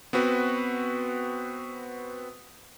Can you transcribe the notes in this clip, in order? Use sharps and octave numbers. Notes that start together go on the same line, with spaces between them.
B3 C4 F#4 B4